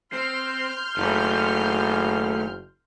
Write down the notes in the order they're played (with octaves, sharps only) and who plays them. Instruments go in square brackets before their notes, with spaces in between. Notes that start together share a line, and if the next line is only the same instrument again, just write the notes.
[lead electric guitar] C4 [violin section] C6 F6 G6
[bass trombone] F#1 [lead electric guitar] D#3 A3